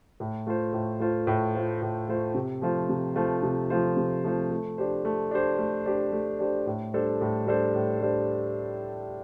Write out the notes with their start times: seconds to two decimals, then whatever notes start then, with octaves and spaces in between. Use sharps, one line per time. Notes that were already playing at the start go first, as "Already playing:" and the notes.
0.20 A2
0.47 A3 F4 C5
0.73 A2
1.00 A3 F4 C5
1.27 A2
1.55 A3 F4 C5
1.82 A2
2.09 A3 F4 C5
2.35 C3
2.62 F3 A3 F4 C5
2.89 C3
3.16 F3 A3 F4 C5
3.43 C3
3.70 F3 A3 F4 C5
3.97 C3
4.24 F3 A3 F4 C5
4.51 A3
4.78 D4 G4 C5
5.05 A3
5.31 D4 G4 C5
5.59 A3
5.86 D4 G4 C5
6.13 A3
6.39 D4 G4 C5
6.66 A2
6.94 G3 D4 A4 C5
7.21 A2
7.47 G3 D4 A4 C5
7.75 A2
8.01 G3 D4 A4 C5